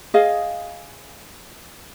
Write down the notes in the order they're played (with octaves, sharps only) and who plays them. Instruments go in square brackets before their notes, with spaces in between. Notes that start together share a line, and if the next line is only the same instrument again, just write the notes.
[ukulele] G#4 D#5 F5